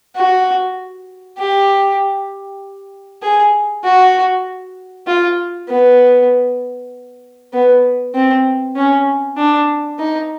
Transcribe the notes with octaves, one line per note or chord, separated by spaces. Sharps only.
F#4
G4
G#4
F#4
F4
B3
B3
C4
C#4
D4
D#4